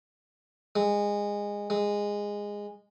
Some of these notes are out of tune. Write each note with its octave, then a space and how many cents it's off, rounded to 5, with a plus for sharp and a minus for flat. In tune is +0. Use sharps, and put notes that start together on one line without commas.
G#3 -20
G#3 -15